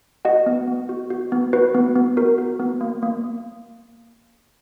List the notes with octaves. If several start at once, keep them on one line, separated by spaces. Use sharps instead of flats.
F#4 D#5 F#5
B3
B3
F#4
F#4
B3
F#4 B4
B3
B3
F#4 A#4
F#4
B3
A#3
A#3